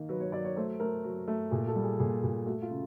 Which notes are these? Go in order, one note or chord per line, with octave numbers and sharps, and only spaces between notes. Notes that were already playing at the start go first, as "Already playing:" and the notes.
Already playing: D#3 A#3
F#3 B4
C#5
F#3 D5
C#5
A3 C5
A3 A#4
F#3
A3
A#2 G#4
A4
G3
G#4
A#2 G#4
A#2
A3 F#4
F4
C#3